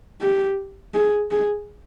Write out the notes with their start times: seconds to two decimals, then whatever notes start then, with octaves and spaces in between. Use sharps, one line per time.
0.21 G4
0.94 G#4
1.31 G#4